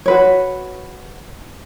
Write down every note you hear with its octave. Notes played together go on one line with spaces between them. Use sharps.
F#4 B4 C#5